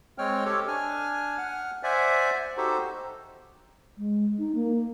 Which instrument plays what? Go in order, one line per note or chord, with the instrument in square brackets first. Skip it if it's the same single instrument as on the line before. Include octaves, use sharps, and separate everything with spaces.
[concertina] G#3 C4 C#5 G5 F6
G4 A4 C#5
D4 G#5 F6
F#5 F6
C5 D5 E5 F#5 G#5
D#4 F#4 G4 A4 C5
[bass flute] G#3
D#4
A#3